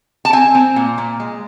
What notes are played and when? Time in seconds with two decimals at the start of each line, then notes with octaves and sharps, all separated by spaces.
0.25 A5
0.33 C4 G#5
0.55 C4
0.76 A#2
0.98 A#2
1.20 G#3